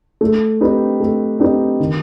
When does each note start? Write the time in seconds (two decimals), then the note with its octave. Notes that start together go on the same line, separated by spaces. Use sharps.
0.21 A3
0.61 C4 D#4 G4 B4
1.00 A3
1.40 C4 D#4 G4 B4
1.80 D#3